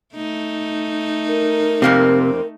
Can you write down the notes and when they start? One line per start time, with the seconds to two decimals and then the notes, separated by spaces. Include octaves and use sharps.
0.16 A3 D#4
1.28 A#4
1.82 F2 C3 A#3 C4